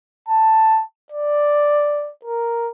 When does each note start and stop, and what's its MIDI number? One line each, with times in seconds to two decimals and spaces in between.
0.29 0.82 81
1.12 2.11 74
2.25 2.70 70